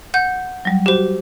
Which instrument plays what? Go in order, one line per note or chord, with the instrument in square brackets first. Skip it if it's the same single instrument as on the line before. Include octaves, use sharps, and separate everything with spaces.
[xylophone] F#5 G6
[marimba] F#3 G3
[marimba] F#4 [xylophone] G4 C5